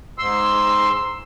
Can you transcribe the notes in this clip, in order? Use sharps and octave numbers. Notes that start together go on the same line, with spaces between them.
G#2 C6 E6